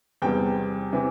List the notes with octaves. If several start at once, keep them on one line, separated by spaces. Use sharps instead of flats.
E2 C3 G3 B3 G5
C3 E3